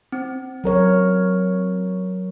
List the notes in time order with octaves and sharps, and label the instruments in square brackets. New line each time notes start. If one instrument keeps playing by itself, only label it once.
[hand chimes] C4
[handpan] F#3 A#4 C#5